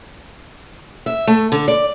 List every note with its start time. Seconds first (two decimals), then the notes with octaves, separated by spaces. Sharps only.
1.06 E5
1.27 A3
1.52 D3
1.68 D5